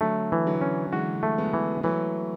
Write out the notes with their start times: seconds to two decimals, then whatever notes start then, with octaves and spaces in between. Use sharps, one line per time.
0.01 D3 F#3 A3
0.32 E3
0.46 D3 F#3
0.61 C#4
0.92 E3 G#3 F#4
1.23 A3
1.38 G#3 B3
1.54 E3
1.83 E3 F#3 A3